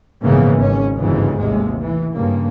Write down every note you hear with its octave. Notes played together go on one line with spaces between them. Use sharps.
A#1 G#2 C#3 E3 A#3 B3
G#1 C#4
G1 D2 G#2 C#3 E3
A1 D#2 C3 G#3
E3
G2 C#3 A#3